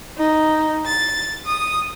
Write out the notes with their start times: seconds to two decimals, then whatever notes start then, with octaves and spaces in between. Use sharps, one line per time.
0.19 D#4
0.86 A6
1.45 D#6